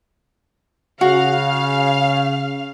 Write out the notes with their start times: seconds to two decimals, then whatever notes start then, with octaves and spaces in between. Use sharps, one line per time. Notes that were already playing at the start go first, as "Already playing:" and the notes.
1.01 C#3 F#4 F5